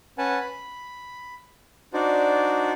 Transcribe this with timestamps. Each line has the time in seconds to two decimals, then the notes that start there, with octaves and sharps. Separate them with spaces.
0.18 C#4 B4 F#5 G#5 A5
0.40 B5
1.93 D4 D#4 F#4 C5 D5